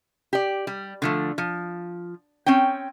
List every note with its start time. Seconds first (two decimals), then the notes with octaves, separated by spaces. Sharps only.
0.33 G4 D5
0.67 G3
1.02 D3 F3 A3
1.38 F3
2.46 C4 C#4 C#5 G5